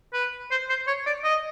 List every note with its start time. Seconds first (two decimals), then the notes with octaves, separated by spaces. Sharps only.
0.13 B4
0.51 C5
0.69 C5
0.87 C#5
1.06 D5
1.24 D#5